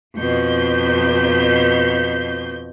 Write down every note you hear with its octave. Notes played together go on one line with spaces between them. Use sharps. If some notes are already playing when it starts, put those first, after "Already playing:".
F2 B2 G6